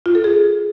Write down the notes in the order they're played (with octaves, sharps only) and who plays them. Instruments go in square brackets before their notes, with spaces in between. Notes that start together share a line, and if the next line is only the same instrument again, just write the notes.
[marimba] F4
A4
G#4